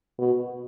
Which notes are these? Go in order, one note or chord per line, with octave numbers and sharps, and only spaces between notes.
B2